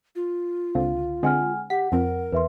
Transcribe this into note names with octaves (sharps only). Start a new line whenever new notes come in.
F4
C#2 D3 C4 F5
D3 G#3 C4 F#5 G#5 F6
G4 F#5 B6
F2 F3 C4 A#4
E2 B4 E5 C6